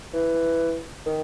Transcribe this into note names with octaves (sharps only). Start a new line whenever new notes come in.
E3
D#3